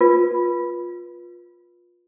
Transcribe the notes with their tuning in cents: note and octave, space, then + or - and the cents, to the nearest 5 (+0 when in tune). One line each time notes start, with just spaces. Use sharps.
F4 +15 B4 -30